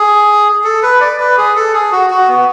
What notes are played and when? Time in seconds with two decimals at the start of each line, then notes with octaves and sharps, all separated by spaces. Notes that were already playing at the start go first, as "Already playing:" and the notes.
Already playing: G#4
0.64 A4
0.83 B4
1.00 D5
1.20 B4
1.37 G#4
1.56 A4
1.74 G#4
1.92 F#4
2.10 F#4
2.28 B3